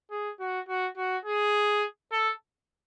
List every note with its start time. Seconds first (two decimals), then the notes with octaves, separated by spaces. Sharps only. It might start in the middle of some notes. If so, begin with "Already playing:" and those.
0.11 G#4
0.40 F#4
0.68 F#4
0.97 F#4
1.25 G#4
2.12 A4